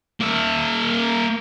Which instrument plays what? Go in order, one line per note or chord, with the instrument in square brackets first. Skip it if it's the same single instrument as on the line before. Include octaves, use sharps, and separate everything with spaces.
[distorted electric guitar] A#3 E5